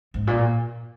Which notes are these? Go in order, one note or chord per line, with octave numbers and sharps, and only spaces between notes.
G#2
A#2